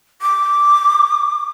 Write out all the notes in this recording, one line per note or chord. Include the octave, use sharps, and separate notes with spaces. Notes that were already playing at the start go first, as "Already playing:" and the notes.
D6